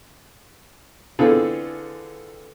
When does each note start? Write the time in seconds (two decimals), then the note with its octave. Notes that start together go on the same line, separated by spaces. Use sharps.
1.19 D3 E3 C4 F4 G#4 A4